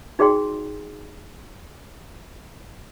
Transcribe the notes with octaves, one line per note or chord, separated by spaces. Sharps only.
D#4 F#4 G#4 D5 G5 C6